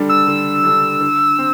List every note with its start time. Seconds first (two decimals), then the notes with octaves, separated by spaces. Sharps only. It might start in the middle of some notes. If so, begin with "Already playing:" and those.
Already playing: D3 G3 D4 A4
0.09 E6
0.27 D3
0.64 G3 D4 A4
1.01 D3
1.38 C4